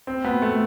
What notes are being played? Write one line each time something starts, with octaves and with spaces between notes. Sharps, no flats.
C4
B3
A3